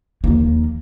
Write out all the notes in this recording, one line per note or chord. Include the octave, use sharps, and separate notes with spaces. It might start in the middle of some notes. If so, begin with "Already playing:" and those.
D#2 A#3